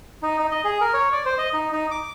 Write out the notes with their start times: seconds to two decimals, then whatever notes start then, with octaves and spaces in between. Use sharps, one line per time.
0.23 D#4
0.39 D#4
0.51 D#5
0.64 G#4
0.81 A#4
0.94 C#5
1.12 D5
1.25 C5
1.38 D#5
1.54 D#4
1.72 D#4
1.91 D6